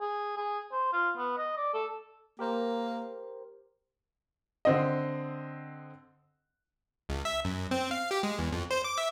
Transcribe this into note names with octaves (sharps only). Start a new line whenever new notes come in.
G#4
G#4
C5
F4
B3
D#5
D5
A4
A#3 G4 A#4 C5
D3 C4 D#5
C#2
E5
F#2
C4
F5
G4
G#3
E2
F2
C5
D6
E5